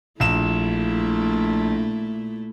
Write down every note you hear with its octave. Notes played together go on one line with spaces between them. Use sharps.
A#1 A#2 A3 E4 E7